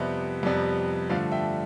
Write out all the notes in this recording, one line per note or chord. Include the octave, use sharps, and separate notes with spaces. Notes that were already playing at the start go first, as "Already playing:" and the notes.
Already playing: F2 C3 G3 B3 C5 E5
F2 C3 G3 B3
G2 D3 F3 A3 D5 F5
E5 G5